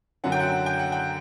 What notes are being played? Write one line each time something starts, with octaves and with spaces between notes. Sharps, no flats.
F#2 D3 F#3 F#5
G5
F#5
G5
F#5
G5